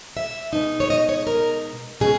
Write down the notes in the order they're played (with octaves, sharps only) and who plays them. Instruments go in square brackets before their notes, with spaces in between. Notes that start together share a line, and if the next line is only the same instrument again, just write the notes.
[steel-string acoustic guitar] E5
B2 G#3 D#4
C#5
D#5
C#5
A#4
B2 G#3 C#4 G#4